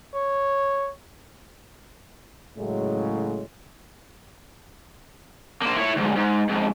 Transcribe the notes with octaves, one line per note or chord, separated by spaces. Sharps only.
C#5
A2 C#3 F#3 G#3
A#3 C5
E4 C#5
D2 G#2
G#2
F2 G#2